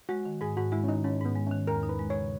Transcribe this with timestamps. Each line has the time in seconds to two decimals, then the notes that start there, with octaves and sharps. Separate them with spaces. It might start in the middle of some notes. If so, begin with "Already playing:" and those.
0.09 G#3 F#4
0.25 D#3 F#4
0.41 G#2 G#4
0.57 G#2 F#4
0.72 G#3 E4
0.84 C#4
0.88 D#3 D#4
1.04 G#2 C#4
1.21 G#2 B3
1.36 G#3
1.47 D#3 C#4
1.67 E2 A#4
1.83 D#4
1.89 B4
1.99 G#3
2.10 C#3 C#5